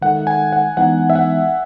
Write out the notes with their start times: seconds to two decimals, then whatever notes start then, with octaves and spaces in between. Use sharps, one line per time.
0.02 D#3 G#3 D#4 A4 E5 F#5
0.27 G#5
0.52 F#5
0.77 E3 G#3 B3 D#4 F#5
1.10 E5
1.15 F#5